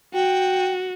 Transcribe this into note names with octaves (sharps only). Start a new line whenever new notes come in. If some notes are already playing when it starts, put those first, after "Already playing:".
F#4 G5